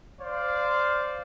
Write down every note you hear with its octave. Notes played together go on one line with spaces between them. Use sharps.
C5 D5 F5